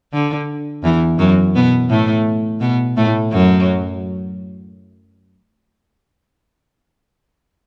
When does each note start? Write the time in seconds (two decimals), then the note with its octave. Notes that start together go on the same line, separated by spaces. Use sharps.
0.13 D3
0.84 E2 E3
1.19 F#2 F#3
1.55 B2 B3
1.90 A2 A3
2.61 B2 B3
2.97 A2 A3
3.32 F#2 F#3